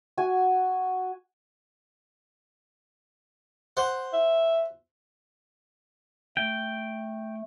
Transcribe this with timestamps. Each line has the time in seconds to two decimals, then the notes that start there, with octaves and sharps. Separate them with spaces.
0.17 F#4 G#5
3.77 C5 F#5
4.13 E5
6.37 A3 G5